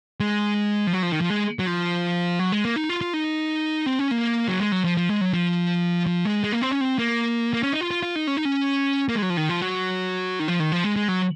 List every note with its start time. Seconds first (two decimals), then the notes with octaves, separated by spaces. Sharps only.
0.20 G#3
0.87 F3
0.93 F#3
1.03 F3
1.12 D#3
1.21 F3
1.30 G#3
1.59 F#3
1.67 F3
2.39 F#3
2.52 G#3
2.65 A#3
2.76 D#4
2.89 F4
3.01 F4
3.14 D#4
3.86 C4
3.99 C#4
4.11 A#3
4.48 F#3
4.60 G#3
4.72 F#3
4.84 F3
4.97 F3
5.09 G#3
5.21 F#3
5.33 F3
6.06 F3
6.25 G#3
6.44 G#3
6.52 A#3
6.62 C4
6.71 C#4
6.81 C4
6.99 A#3
7.53 A#3
7.63 C#4
7.73 D#4
7.81 F4
7.91 F4
8.03 F4
8.16 D#4
8.27 C#4
8.37 D#4
8.45 C#4
9.09 A#3
9.15 G#3
9.22 F#3
9.30 F3
9.37 D#3
9.49 F3
9.62 F#3
10.40 D#3
10.48 F3
10.60 D#3
10.72 F3
10.84 G#3
10.96 G#3
11.08 F#3